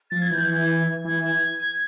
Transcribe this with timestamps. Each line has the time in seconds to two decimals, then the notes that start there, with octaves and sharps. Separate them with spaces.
0.11 F3 A6
0.22 G#6
0.31 E3 G6
0.45 G#6
1.04 E3 G#6
1.24 G#6